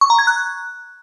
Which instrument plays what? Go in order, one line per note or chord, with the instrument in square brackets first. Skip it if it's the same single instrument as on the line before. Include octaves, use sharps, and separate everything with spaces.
[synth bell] C#6
A#5
G#6
F#6